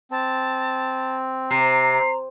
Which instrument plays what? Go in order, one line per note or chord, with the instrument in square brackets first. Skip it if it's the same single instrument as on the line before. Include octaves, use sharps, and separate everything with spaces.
[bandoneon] C4 [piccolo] A5
[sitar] C3 [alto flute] A#5 [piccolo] C7